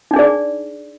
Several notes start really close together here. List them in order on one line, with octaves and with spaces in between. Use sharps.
D#4 D4 G#4 D5